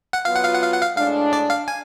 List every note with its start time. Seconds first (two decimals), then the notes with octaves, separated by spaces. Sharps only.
0.13 F#5
0.25 F#3 B3 F4 F5
0.35 F#5
0.45 F5
0.54 F#5
0.62 F5
0.73 F#5
0.82 F5
0.97 A2 G#3 D4 F5
1.33 D5
1.50 F5
1.68 G#5